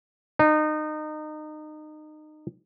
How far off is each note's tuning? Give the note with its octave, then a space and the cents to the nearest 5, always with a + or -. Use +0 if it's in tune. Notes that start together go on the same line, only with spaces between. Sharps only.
D#4 -25